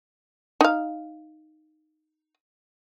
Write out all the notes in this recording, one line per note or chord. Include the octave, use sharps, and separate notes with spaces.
D#4 F5